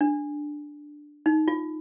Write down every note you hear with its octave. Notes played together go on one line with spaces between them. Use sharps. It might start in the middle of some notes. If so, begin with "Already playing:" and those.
D4
D#4
F4